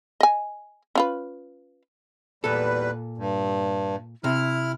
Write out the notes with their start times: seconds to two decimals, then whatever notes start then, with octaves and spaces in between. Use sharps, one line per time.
0.21 D#5 G#5
0.95 C#4 F4 B4
2.44 E2 A#2 G3 A4 B4
3.18 G2
4.24 C3 E4 F6